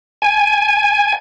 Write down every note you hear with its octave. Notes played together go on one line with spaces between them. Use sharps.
G#5